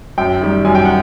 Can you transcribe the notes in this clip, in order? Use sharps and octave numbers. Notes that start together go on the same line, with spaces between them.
F#2 G5
D#3 G3
F#2 G#5
G5
F#5